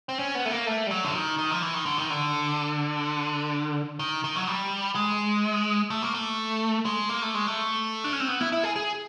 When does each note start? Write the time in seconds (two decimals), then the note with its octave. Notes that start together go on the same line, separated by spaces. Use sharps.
0.09 C4
0.19 C#4
0.35 B3
0.45 A3
0.51 A#3
0.67 A3
0.87 G3
0.91 F#3
1.04 D3
1.15 D#3
1.38 D#3
1.51 F3
1.62 E3
1.74 D#3
1.86 D3
1.98 D#3
2.10 D3
3.99 D#3
4.24 D#3
4.36 F#3
4.47 G3
4.95 G#3
5.90 A3
6.02 A#3
6.14 A3
6.85 G#3
7.09 A#3
7.22 A3
7.35 G#3
7.47 A3
8.04 D4
8.13 C#4
8.20 C4
8.28 B3
8.41 E4
8.52 E4
8.64 G#4
8.76 G#4